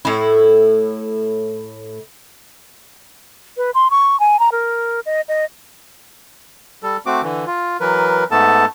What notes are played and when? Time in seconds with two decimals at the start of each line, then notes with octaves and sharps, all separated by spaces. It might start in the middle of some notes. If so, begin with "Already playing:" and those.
0.05 A2 E4
3.57 B4
3.74 C6
3.91 C#6
4.20 G#5
4.39 A#5
4.52 A#4
5.06 D#5
5.28 D#5
6.83 G3 A4
7.06 A3 C4 F#4 D6
7.23 D3 E3
7.47 F4
7.80 E3 F#3 A#4 B4
8.31 G#2 A3 B3 A4 A5